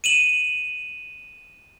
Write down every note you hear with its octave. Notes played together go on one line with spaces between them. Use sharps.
D#7 E7 F#7